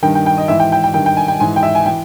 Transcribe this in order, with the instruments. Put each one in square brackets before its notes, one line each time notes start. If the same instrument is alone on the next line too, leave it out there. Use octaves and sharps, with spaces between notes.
[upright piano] G2 D#3 G5
G5
G5
D#5
G#2 E3 E5
G5
G5
G5
G2 D#3 G5
G5
G#5
G5
G#2 E3 G#5
G5
E5
G#5
E3 G5